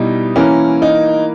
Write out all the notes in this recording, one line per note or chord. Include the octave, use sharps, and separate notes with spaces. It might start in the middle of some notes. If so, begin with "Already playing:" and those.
Already playing: B2 G3 D#4 E4
E3 A#3 C#4 E4 A#4
D#4